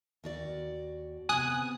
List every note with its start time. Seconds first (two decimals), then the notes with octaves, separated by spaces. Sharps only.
0.24 D#2 F#4 D5
1.29 C3 B3 G#5 D#6 F#6